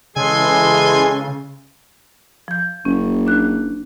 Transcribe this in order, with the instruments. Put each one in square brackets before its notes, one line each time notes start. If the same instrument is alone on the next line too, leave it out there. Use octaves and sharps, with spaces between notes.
[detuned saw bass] C#3 [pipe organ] E3 C6 [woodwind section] G#3 G#4 A4 [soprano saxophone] G#5
[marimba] F3 G6
[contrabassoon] F#1 [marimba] C#4
[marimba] D4 F#6